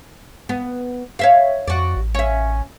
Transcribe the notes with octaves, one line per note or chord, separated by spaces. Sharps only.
B3
C#5 E5 F5
F2 F#4 D5
A1
C#4 E5